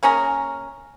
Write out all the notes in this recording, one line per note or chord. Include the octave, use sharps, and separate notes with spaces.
A#3 C#4 G#4 A#4